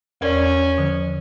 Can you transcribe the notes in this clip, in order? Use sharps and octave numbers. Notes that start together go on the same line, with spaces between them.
E2 C#4 A#4 D5
D3 F3